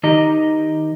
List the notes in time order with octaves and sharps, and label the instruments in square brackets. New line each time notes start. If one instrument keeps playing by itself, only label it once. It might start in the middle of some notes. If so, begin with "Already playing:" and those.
[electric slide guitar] D#3 D#4 G4 D#5 A#5